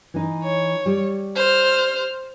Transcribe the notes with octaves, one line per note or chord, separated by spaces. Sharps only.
E3 D#4
C#5
G3
C5 F6